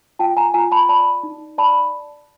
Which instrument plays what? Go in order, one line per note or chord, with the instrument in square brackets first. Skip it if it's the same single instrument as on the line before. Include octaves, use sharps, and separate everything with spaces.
[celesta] F4 G5 A5
G#5 A#5
F4 G#5 A#5
A5 B5
D5 A5 B5
D#4
D5 A5 B5